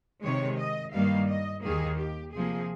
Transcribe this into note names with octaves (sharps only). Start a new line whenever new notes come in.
C3 D#3 G#3 C#5
D#5
G2 D#3 G3 A#3 F5
D#5
D#2 D#3 A#3 G#4
G4
C3 F3 A#3 G#4